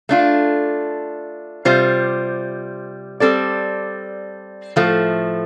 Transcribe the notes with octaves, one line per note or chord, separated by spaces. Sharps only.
A3 D4 F4
C3 G3 F4 C5
G3 C4 A4 D5
A2 F3 A3